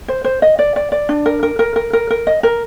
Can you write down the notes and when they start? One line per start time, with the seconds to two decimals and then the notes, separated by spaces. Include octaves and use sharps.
0.08 C5
0.25 C5
0.42 D#5
0.59 D5
0.76 D5
0.92 D5
1.09 D4
1.26 A#4
1.43 A#4
1.59 A#4
1.76 A#4
1.93 A#4
2.11 A#4
2.27 D#5
2.43 A#4